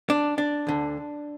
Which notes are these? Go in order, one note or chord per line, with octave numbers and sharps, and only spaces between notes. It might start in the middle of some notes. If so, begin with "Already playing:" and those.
D4
D4
D2 D3